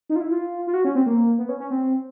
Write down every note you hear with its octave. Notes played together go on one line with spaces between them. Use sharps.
D#4
F4
E4
F4
F4
F#4
C#4
C4
A#3
B3
C#4
C#4
C4